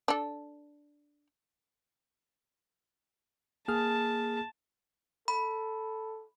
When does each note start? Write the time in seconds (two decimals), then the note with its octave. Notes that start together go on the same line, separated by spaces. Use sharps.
0.08 D4 A4
3.68 A#3 G#4 A5 F6
5.28 A4 B5